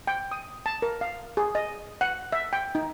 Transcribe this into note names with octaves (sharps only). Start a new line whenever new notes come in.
G5
D#6
A5
A#4
F5
G#4
D#5
F#5
E5
G5
D#4